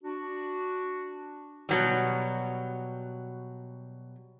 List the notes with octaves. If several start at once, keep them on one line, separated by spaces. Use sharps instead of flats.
D4 F#4
B2 F#3 G3